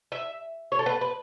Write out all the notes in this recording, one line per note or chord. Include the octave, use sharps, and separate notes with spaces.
E5
C#5
A4
B4
B4